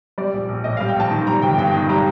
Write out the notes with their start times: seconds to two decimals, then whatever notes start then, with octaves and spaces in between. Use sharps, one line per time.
0.18 G3 D5
0.33 A#1
0.49 A#1
0.64 A2 D#5
0.77 F5
0.80 G3
0.88 G5
0.96 A#1 A5
1.11 D#3
1.27 G3 A#5
1.42 G1 G5
1.58 G2 G5
1.74 D#3
1.89 G3 A#5